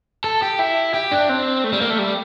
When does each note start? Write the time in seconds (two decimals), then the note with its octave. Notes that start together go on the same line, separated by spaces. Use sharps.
0.24 A4
0.42 G4
0.59 E4
0.94 G4
1.12 D4
1.29 C4
1.64 A3
1.73 G3
1.81 A#3
1.90 A3
1.99 G3